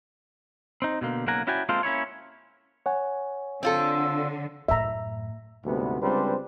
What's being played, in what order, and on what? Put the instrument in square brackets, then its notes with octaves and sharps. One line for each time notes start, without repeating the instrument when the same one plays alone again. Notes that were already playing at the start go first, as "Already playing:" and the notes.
[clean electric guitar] C4 D#4
B2 D3 A#3
B1 C#3 A#3 F#5 G#5 A#5
C#4 E4 F#4 D5 G5 G#5
G#3 A#3 C4 F4 A4 C5
A#3 C#4 E4 C#5
[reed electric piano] C#5 F#5 G#5
[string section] D3 [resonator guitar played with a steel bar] C4 F4 A4 [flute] E6
[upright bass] F#2 A2 [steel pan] E5 A#5
[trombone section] D2 G#2 C3 G3 B3
C#2 G3 C4 D4 B4 C5